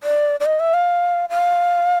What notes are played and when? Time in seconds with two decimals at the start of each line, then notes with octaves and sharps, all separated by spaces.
0.03 D5
0.40 D5
0.46 D#5
0.60 E5
0.74 F5
1.30 F5